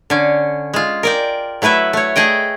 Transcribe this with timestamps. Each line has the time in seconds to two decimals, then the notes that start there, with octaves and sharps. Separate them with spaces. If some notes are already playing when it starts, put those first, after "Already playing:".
0.10 D3 C#4
0.74 G#3 F4
1.03 A#4 D5 G5
1.62 F#3 A3 E4 B4 E5
1.93 A3 C#5
2.16 A3 G#4 D#5 G5